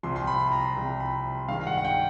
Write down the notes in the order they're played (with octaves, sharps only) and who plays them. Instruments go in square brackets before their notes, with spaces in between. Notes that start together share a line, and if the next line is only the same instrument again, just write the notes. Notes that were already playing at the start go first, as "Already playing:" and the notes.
[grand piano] C2 C3 F3 C6
C6
B5
A#5
C2 C3 F3
B5
G2 D#3 G#3 F5
F#5
F#5
G5